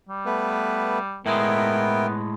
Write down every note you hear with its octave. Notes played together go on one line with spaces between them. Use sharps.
G3
A3 B3 B4
A2 G#3 B3 E4 A#4 G5